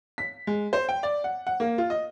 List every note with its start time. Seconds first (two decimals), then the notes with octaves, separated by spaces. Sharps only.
0.18 B6
0.47 G#3
0.73 C5
0.89 G5
1.03 D5
1.24 F#5
1.47 F#5
1.60 A#3
1.78 F4
1.90 D#5